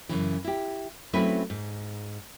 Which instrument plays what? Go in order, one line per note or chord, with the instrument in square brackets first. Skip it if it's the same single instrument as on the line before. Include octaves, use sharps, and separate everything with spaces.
[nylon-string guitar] F#2 C#3 E3
E4 G4
F#3 A3 C4 C#4 E4 B4
G#2